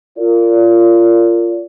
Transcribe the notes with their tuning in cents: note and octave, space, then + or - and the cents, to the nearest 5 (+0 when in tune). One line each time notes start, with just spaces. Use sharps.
F4 -20 A#4 -20 D5 -35